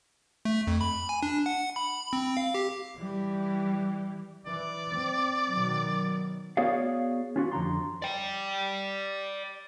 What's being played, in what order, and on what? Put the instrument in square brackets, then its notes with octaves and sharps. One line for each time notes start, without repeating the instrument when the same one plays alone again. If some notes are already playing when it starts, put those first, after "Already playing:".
[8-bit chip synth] A3
F2
B5
G#5
D4
F#5
B5
C4
F5
G4
[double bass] E3 G3
[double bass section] E3 [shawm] D5
[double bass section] C4
B2 D#3 F#3
[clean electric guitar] B3 F#4 G#4 C#5 D5 F5
C#4 F4 F#4
F2 D3 A#5 C6
[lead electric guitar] D5 G5